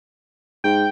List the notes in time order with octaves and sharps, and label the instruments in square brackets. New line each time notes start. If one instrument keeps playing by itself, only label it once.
[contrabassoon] G#2 [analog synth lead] G5